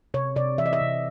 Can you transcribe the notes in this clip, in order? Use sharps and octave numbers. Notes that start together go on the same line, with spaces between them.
C3 C#5
C3 D5
E3 E5
D#5
E5
C3